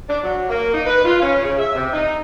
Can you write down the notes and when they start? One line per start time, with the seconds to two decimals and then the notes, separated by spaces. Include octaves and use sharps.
0.09 D4
0.23 F#3
0.49 A#3
0.73 D#4
0.86 B4
1.04 F4
1.21 C#4
1.42 C#3
1.59 E5
1.75 C3
1.92 D#4